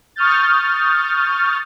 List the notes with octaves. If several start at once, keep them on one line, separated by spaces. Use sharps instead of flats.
C#6 D#6 F6 G6 A6